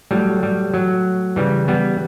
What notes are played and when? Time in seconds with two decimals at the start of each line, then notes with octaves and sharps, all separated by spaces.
0.11 A2 F#3 G3
0.43 G3
0.74 F#3
1.36 C#3 E3 G3
1.68 G3 B3